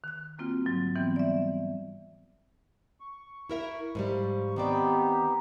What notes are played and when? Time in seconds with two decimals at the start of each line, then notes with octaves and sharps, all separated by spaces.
0.04 D#3 F#6
0.38 G3 A#3 C4 F4 F#4
0.66 G#2 D3 F#3
0.96 E3 G3 B3 C4
1.16 D5 E5
3.00 C#6
3.49 E4 A#4 E5
3.95 G#2 F3 G3
4.56 D#3 B3 C4 D#4 G4 D5